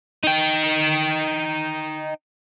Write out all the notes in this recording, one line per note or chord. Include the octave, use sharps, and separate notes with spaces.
D#4 G5